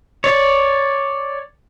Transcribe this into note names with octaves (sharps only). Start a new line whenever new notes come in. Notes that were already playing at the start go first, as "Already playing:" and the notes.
C#5 D5